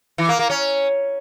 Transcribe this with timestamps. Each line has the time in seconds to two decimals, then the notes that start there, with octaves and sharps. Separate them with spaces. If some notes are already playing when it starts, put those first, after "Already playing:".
0.18 E3
0.29 A#3
0.39 A#3
0.50 C#4